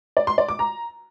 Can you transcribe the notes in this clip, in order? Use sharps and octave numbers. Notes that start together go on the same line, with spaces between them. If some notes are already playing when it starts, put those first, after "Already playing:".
D5
C6
D5
D6
A#5